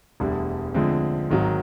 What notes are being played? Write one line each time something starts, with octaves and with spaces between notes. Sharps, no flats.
E1 D2 D3 G3
D2 D3 F3 G#3 C4
G#1 G#2 D#3 F#3